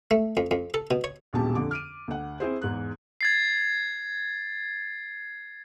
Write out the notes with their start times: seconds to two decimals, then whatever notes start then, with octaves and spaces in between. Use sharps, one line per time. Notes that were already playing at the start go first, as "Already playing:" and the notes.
0.11 A3
0.37 F2
0.51 F2
0.74 A4
0.91 B2
1.04 C#5
1.33 D#1 A#1 B2 G#3 G4 A5
1.55 F2 D3 D6
1.71 F6 D7 D#7
2.08 D2 F#5
2.40 C4 E4 G#4 C5
2.62 E2 G#2 F#6
3.21 G#6 A6 C7